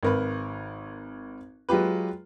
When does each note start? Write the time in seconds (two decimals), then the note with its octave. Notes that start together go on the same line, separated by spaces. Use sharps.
0.03 G#1 A#4 B4
1.69 F#3 G#3 F4 G4 B4